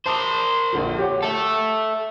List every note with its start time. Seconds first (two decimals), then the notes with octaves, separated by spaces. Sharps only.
0.06 A#4 C5 A5 D6 D#6
0.73 A#1 D3 F3
0.99 G4 C#5 F#5
1.22 A4 E5